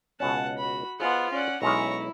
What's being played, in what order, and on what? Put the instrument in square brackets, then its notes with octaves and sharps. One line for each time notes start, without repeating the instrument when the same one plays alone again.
[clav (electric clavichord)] C#2 B2 C#4 [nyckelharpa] F#5 A5
[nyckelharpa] F#4 B5
[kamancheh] B3 F4 [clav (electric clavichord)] G#4 C5 D#5 [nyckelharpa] F#5
[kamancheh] C#4 [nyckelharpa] D5 F#5
[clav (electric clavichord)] B1 G#3 C#4 [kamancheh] E4 [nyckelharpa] A#5 C#6